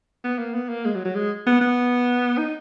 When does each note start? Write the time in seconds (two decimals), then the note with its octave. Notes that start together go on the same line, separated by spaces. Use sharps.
0.24 B3
0.39 A#3
0.54 B3
0.69 A#3
0.85 G#3
0.95 F#3
1.05 F#3
1.15 G#3
1.47 B3
1.61 B3
2.38 D#4